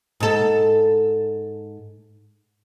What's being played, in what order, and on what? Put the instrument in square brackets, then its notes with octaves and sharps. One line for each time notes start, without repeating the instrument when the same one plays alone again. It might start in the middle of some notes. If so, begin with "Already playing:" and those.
[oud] G#2 A4